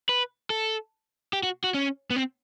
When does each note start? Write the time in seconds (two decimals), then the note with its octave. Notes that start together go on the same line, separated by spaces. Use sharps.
0.09 B4
0.50 A4
1.33 G4
1.43 F#4
1.64 F#4
1.74 C#4
2.10 B3
2.16 C4